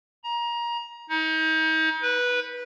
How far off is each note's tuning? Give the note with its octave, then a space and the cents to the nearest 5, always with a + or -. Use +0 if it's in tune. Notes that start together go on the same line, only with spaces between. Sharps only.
A#5 +25
D#4 +35
B4 -10